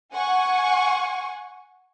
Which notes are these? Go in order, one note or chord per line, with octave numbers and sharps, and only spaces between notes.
F#5 G#5 C#6